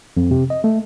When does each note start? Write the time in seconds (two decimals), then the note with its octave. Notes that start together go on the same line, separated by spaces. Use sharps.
0.17 F2
0.31 C3
0.50 D#5
0.64 A3